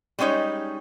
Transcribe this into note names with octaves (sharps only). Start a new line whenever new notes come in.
G3 G#3 C#4 D#4 C#5